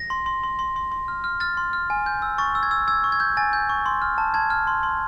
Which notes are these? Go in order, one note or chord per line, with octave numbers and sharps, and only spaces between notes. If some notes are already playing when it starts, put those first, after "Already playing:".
Already playing: A#6
C6
C6
C6
C6
C6
C6
F6
F6
F6 A6
C6
F6
G#5
G6
E6
C#6 A6
E6
G#6
E6
E6 G#6
C#6
G#6
G6
G#5 A6
G6
C#6
C6
F6
A5
A5 G#6
F6
C6
C6